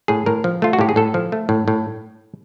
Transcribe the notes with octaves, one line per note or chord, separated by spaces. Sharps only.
A2 G#4
A2 A#4
F3
A3 F4
F#4
A2 G4
G#4
A2 A4
F3
A3
A2
A2